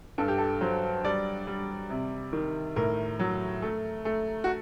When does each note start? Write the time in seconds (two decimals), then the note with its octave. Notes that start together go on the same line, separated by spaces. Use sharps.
0.18 G2 A4
0.28 G4
0.38 A4
0.61 F#3 C5
1.04 G3 D5
1.47 G3
1.90 C3
2.33 D#3
2.76 A2 A#4
3.20 F#3
3.62 A3
4.05 A3
4.44 F#4